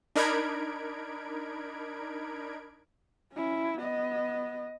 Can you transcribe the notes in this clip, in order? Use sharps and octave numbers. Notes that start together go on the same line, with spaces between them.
D4 D#4 A#4 B5 G#6 D7
C#4 E4
B3 D#5